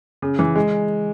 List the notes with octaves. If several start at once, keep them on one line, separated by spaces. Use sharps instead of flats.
C#3
E3
G#3